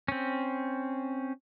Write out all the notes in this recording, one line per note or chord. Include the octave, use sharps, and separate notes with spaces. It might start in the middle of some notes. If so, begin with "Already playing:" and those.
C4 C#4